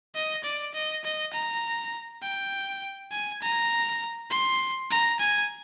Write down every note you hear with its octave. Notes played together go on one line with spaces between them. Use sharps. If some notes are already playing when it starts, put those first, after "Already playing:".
D#5
D5
D#5
D#5
A#5
G5
G#5
A#5
C6
A#5
G#5